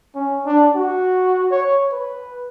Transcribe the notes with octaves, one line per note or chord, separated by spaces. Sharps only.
C#4
D4
F#4
C#5
B4